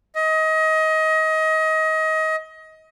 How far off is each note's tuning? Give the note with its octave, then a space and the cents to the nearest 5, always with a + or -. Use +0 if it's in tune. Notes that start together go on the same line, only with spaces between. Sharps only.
D#5 +25